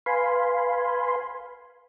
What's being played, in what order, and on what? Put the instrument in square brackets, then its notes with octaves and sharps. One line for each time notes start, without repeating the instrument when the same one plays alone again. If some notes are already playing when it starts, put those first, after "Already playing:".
[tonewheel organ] B4 F5 G#5 B5 C6